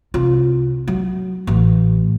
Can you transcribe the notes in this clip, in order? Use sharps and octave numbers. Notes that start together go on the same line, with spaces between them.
C2 F4
F#3
A1